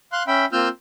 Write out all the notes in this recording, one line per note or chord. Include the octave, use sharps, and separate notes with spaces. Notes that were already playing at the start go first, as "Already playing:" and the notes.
F5 C6 F#6
C#4 E5 G5 B5
A#3 C4 F4 E6 F6 G6